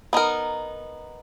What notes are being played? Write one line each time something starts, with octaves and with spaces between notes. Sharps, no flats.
B3 D#4 A#4